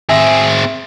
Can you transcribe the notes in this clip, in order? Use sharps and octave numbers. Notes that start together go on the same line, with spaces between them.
C4 G#4 E5 A#6